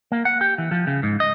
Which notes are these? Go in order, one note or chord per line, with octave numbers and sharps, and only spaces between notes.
A#3
F#5
G4
E3
F3
C#3
G#2
D#5